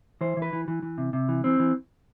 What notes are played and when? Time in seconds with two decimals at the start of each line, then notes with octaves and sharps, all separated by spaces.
0.21 E3 C5
0.37 E3
0.42 B4
0.53 E3
0.68 E3
0.82 E3
0.98 C3
1.13 C3
1.29 E3
1.44 E3 C4
1.59 E3